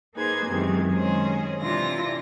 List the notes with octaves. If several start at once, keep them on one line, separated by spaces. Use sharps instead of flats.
A#3 D#4 G#4 B4 C5 G#6
F#2 C3 D#3 E3 G#3
D#3 G#3 C#4 G#4 C5
C3 E3 D4 E4 F4 A#6